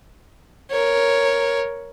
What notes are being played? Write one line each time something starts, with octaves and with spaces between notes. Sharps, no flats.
A#4 C#5